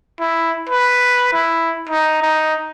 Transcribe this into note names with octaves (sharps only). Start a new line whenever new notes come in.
E4
B4
E4
D#4
D#4